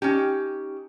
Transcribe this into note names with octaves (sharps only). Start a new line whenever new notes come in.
C#4 D#4 G4